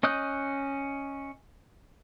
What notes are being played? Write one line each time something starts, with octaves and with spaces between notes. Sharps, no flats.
C#4 D#5 D#6 F#6 G6